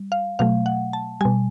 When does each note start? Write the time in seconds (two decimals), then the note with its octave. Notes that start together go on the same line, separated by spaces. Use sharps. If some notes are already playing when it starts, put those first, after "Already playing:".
Already playing: G3
0.12 F5
0.39 B2 F#3 A3 F5
0.66 F#5
0.93 A5
1.21 B2 G3 G#5